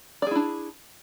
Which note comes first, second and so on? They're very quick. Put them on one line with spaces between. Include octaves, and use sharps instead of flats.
D5 G#4 E4 D4